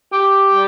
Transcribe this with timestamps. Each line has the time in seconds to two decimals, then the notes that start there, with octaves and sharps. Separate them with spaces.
0.12 G4
0.52 G3